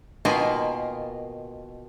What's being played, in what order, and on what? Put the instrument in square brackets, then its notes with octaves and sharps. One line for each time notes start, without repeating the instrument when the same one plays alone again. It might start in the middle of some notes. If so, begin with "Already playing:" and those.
[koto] B2 D#3 A#3 F4 A#4 G#5